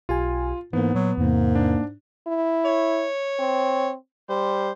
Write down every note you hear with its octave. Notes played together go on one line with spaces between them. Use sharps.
B1 F4 G4 G#5
G#2 E3 A#3 B3
A#2 F#3
E2 G#2 C3 A#3
D4
E4
C#5
C4
G3 C5